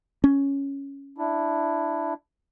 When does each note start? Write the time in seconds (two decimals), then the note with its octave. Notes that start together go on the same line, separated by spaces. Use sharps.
0.24 C#4
1.18 D4 E4